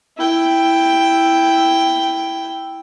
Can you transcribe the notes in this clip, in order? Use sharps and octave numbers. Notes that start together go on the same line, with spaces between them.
E4 G5